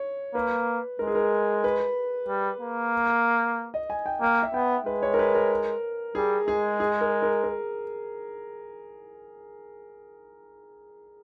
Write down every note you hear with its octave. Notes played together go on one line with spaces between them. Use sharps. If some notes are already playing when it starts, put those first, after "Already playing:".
Already playing: C#5
A#3 B4
G#3 A#4
G#4
A#4
B4
G3
A#3
D#5
G#5
G5
A#3 G5
E5
B3 G5
G#3 B4
C#5
A#4
B4
A#4
G3 G#4
G#3 G#4
G#4
A#4
A#4
A#4